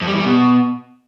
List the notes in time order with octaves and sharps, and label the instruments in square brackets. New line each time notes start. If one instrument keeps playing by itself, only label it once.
[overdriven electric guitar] F2
G3
E3
G3
B2